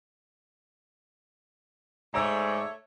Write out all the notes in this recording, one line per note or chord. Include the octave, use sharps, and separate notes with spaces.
G#2 A3 C#5 D5 A#5 E6